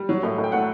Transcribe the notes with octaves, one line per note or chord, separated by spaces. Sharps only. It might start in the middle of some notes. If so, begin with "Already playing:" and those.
Already playing: G3
F#3
A2
A2
G5
A3 F#5